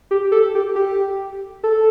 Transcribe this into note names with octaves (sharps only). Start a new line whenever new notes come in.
G4
A4
G4
G4
A4